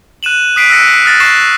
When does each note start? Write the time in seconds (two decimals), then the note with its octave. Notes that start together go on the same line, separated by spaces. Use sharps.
0.23 F#6 D#7 E7 F#7
0.56 D#6 F#6 B6 C7 D7 D#7
0.70 E6 F#6 A#6 C#7
0.86 C7
1.05 D#6 F6 F#6 A6 A#6
1.20 C#6 F#6 A#6 C7 E7